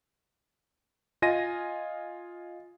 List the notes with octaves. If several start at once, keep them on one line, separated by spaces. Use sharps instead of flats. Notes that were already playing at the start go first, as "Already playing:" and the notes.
F4 D#5 G#5 A#6 D#7